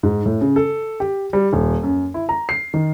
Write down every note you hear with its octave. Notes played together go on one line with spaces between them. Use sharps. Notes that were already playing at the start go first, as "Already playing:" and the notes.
G#2
A2
C#3
A4
G4
G3
D#1
F#2
E4
A#5
C7
D#3